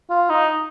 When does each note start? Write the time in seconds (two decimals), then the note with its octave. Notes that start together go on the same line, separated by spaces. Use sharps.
0.10 F4
0.30 D#4